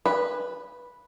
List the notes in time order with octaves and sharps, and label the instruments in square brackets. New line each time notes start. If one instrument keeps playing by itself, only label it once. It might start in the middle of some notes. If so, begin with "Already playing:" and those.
[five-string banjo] B4